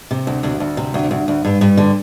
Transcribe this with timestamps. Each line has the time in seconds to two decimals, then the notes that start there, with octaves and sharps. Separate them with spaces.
0.11 C3
0.27 D2
0.43 D2
0.60 D2
0.77 C3
0.94 D2
1.11 D2
1.28 D2
1.45 G2
1.61 G2
1.77 D3